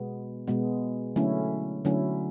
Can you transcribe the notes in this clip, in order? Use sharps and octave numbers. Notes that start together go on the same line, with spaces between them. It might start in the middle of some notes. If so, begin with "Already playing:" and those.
Already playing: B2 G#3 B3
B2 G#3 B3
D3 F#3 A3 C#4 E4
D3 F#3 A3 C#4 E4